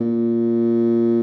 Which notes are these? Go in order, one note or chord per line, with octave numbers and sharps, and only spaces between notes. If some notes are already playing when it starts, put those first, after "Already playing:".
A#2